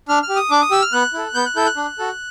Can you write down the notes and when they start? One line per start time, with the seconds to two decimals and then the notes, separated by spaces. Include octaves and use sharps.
0.09 D4 F6
0.23 F6
0.29 G4
0.36 D#6
0.51 D4 D6
0.62 D#6
0.71 G4 E6
0.82 F6
0.92 B3 F#6
1.14 E4 A4
1.34 B3 G6
1.46 F#6
1.56 E4 A4 G6
1.66 F#6
1.77 D4
1.99 F#4 A4